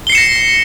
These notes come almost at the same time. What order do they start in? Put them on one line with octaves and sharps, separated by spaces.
G7 C7 C#7 E7 A#6